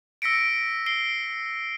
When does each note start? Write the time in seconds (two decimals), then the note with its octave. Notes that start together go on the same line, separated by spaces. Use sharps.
0.22 E6 A#6 B6 C#7 D7
0.86 C7 D7 G7